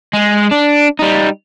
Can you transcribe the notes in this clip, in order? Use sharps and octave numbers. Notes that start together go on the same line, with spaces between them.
G#3
D4
G3 D#4